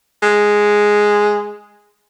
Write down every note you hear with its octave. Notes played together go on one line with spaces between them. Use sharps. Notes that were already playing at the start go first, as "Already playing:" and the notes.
G#3